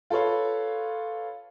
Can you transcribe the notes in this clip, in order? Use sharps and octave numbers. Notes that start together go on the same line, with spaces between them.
F4 A4 B4 C#5 F5